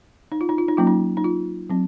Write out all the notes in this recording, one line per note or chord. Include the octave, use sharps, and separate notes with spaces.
D#4
F4
D#4
F4
D#4
F#3 A#3 C#4 F4
D#4
D#4
F4
F#3 C4